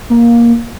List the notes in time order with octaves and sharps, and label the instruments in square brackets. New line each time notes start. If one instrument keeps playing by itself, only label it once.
[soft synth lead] A#3